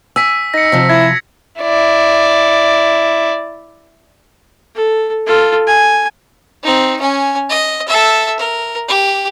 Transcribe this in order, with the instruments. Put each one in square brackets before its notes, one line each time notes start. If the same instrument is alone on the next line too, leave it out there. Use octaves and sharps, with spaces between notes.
[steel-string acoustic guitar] G#5 [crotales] E6 B6
[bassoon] D#4 [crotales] A#6 C#7
[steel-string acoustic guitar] C3 F3
[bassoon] E4 [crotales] G#6
[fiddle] E4 D5
[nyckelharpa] A4
F4 A4
G#5
[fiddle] C4 D#4
C#4 G#5
D#5
A4 E5
A#4
G4